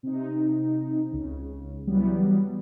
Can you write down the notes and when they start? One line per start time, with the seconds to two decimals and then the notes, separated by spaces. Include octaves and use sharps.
0.03 C3 D#4
1.12 C#2 C#3
1.87 E3 F#3 G3 B3